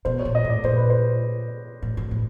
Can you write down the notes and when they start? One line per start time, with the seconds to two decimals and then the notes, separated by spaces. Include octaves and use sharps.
0.05 B2 C5
0.19 C#5
0.25 A#2
0.35 D#5
0.44 A2 D5
0.64 A#2 C5
0.76 B4
0.90 C5
1.82 A2
1.97 G#2
2.11 A2